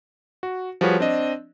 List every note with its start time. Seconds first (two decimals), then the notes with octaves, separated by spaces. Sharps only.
0.43 F#4
0.81 F3 G3 F#4 G#4 B4 C#5
1.00 C4 D4 D#5